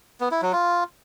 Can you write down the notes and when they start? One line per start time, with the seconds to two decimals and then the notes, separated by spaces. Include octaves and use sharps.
0.21 B3
0.31 E4
0.42 F#3
0.53 F4